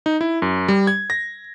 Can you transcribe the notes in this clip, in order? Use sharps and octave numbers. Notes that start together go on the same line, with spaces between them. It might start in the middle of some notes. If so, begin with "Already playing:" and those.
D#4
E4
F#2
G3
G#6
A#6